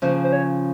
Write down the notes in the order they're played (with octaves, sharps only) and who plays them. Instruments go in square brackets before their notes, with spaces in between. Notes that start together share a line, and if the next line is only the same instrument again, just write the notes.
[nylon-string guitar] C#3 F3 A#3 C#4 [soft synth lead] C5
[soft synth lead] C5
C#5